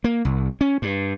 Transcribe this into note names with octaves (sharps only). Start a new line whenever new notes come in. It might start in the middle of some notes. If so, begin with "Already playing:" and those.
A#3
C2
C#4
G2